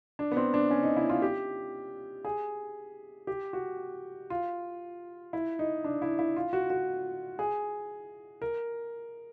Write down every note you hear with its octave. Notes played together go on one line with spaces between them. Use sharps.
D4
B3
C4
D4
C#4
D#4
E4
F4
G4
G#4
G4
F#4
F4
E4
D#4
D4
E4
E4
F4
F#4
F#4
G#4
A#4